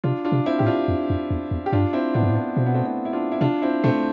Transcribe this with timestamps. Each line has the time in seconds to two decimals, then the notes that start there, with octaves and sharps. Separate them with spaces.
0.04 C3 D4 F4
0.25 D4 F4
0.32 C3
0.46 C4 E4
0.59 A2 G4
0.66 D4 F4
0.88 F2
1.10 F2
1.31 E2
1.51 E2
1.66 G4
1.73 G2 D4 F4
1.93 C4 E4
2.14 A2 B3 D4
2.23 G2
2.30 A2 C4
2.36 B3 D4
2.57 B2 C4
2.66 B3
2.74 A3 C4
2.85 C4 E4
3.05 E4
3.13 D4 F4
3.32 E4
3.41 C3 D4 F4
3.62 C4 E4
3.84 B2 A3 C4